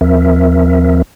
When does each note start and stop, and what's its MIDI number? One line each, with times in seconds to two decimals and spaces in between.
0.01 1.02 39
0.01 1.02 53
0.01 1.02 60
0.01 1.02 70
0.01 1.02 76